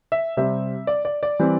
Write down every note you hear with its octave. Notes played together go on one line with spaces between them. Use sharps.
E5
C3 G3 C4 E5
D5
D5
D5
E3 G3 C4